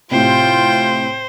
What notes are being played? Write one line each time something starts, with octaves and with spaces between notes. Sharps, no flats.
A2 C3 F4 C5 G5